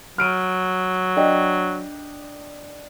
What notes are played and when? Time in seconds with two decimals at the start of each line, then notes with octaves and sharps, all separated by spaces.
0.18 F#3 F6 D7 D#7
1.17 D4 D#5 G5